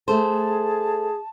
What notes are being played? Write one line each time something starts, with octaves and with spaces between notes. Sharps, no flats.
A3 G#4 A4 C5 A5